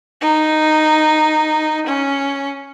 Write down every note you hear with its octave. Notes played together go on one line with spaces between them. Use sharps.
D#4
C#4